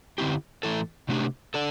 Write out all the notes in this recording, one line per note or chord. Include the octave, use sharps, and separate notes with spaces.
D3 C4 E4 G4
A2 E3 A3 E4 A4
C3 A3 D4 G4
D4 A4